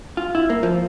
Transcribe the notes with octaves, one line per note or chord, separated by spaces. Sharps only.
F4
E4
A#3
F3